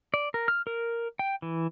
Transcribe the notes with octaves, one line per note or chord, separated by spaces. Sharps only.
D5
A#4
F6
A#4
G5
E3